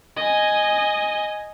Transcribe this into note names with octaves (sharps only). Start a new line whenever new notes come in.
D#5 G#5